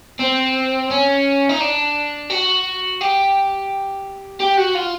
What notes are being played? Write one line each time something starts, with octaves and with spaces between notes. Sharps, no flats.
C4
C#4
D#4
D4
F#4
G4
G4
F#4
F4